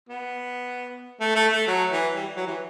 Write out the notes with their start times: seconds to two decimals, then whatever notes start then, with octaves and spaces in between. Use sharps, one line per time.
0.09 B3
1.20 A3
1.35 A3
1.52 A3
1.67 F#3
1.92 E3
2.15 G3
2.36 F#3
2.47 E3